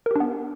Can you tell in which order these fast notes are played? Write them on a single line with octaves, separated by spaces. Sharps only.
A#4 G4 D4 B3